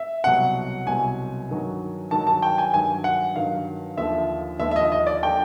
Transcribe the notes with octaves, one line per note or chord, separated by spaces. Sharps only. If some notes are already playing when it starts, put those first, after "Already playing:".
Already playing: E5
C2 B2 F#3 F#5
C2 B2 F#3 G#5
G2 D#3 F#3
G2 D#3 F#3 A5
A5
G5
G#5
G2 D#3 F#3 G#5
F#5
G2 D#3 F#3 F5
D#2 D3 F3 E5
D#2 D3 F3 E5
E5
D#5
D#5
D5
D3 F3 G5